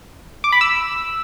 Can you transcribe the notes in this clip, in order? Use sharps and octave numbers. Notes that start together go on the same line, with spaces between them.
D6
B5
E6